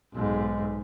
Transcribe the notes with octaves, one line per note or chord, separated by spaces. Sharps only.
B1 G#2